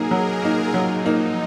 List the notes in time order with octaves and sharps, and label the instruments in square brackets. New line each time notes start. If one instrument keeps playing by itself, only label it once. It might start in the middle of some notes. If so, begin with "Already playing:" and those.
Already playing: [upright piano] F#3 A#3 D#4 [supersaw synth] G#4 A#4
[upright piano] F#3 [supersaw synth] G#4
[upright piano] A#3 D#4 [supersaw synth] F4
[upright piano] F#3 [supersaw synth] D#4
[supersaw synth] F3 [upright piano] A#3 D#4